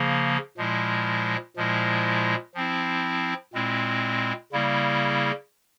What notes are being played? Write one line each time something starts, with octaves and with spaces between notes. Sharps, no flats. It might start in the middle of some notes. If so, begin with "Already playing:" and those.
Already playing: C#3 F3 A#3
A#2 F3 G#3 E4
A#2 F3 G#3 E4
F3 C4 E4
A#2 G#3 C4 E4
C#3 G3 A#3 E4